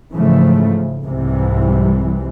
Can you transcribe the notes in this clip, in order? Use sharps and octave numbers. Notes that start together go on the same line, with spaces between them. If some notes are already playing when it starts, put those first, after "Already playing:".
G#2 C#3 E3 F3 A3
C2 G#2 C3 E3 G3